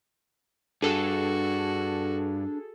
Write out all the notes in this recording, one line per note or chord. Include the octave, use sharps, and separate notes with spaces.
G2 D4 F#4 G#4 A4